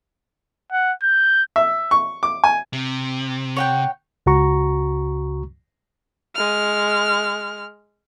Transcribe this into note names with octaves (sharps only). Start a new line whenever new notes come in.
F#5
G6
E5
C#6
D6
G#5
C3
C#5 F#5 G5
C#2 C#3 F#4 A#5 C#6
G#3 F6